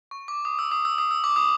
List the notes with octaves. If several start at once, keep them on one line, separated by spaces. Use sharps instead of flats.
C#6
D6
D#6
E6
D#6
E6
D#6
E6
D6
D#6